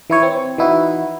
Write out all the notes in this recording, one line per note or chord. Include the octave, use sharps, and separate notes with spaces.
E3 E4 C#5
C4
E3 D#4 E4 F#4